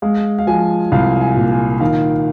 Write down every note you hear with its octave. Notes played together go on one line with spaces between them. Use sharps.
G#3 F5
F5
F3 G#5
C2 F5
G#5
A#2
G#5
D#3 F5